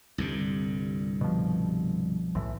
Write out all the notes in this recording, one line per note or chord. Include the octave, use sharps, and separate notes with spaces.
C2 G2 D3
B2 F3
B1 A2 E3